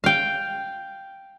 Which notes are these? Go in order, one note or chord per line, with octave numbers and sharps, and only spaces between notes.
F5 G5